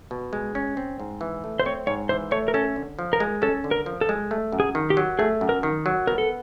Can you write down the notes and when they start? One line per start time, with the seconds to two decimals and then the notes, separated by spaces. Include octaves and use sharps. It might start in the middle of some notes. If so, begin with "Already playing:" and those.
0.11 B2
0.33 G#3
0.55 C#4
0.77 C4
1.00 G#2
1.21 E3
1.44 A3
1.60 C5
1.66 C4 C#5
1.87 G#2 C#5
2.09 E3 C5
2.31 A3 C#5
2.48 A#4
2.54 C#4 A4
2.76 D3
2.99 F3
3.13 A#4
3.20 G#3
3.42 C#4 A4
3.64 D3
3.71 A#4
3.86 F3
4.01 A4
4.09 G#3
4.31 A3
4.52 F#2
4.60 G#4
4.75 D#3
4.90 G4
4.97 F#3
5.19 A3 G#4
5.41 F#2
5.49 A#4
5.63 D#3
5.86 F#3
6.07 B3 A#4
6.18 A4